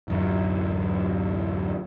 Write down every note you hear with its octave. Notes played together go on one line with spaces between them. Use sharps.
D1 F#2